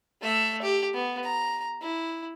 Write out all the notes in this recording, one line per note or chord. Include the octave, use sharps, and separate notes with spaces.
A3 E5
G4
B3
A#5
E4